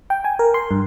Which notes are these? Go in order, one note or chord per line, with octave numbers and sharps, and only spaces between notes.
G5
G#5
A#4
C6
G2